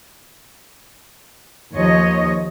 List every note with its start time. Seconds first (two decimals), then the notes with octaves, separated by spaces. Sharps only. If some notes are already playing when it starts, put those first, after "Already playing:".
1.75 D#2 F3 C#5 D#5